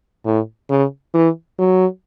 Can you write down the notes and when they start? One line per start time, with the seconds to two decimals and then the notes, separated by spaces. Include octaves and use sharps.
0.26 A2
0.70 C#3
1.14 E3
1.59 F#3